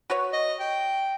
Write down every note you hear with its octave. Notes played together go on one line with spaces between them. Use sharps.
F#4 B4 C#5
D#5
G5